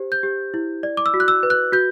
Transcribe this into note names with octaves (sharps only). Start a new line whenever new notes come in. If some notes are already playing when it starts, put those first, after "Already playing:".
Already playing: G4 C5
G6
G4
E4
D5
D6
E6
F#4
F#6
E6
B4
F#6
F#4 G6